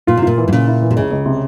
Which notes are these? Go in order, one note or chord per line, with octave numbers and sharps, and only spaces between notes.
A#2 F4
C3
A#2 F4
E3
G#2
A#2 C#3
E4
E3
C3
C#2 C#3
C#2
C3